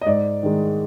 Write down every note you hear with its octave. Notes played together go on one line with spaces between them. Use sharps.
D#5
G#2 D5
D#3 G#3